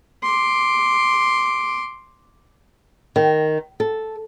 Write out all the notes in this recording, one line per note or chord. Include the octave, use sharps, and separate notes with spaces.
C6 D6
D#3
A4